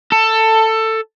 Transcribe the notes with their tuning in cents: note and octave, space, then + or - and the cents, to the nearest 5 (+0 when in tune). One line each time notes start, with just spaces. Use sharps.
A4 +15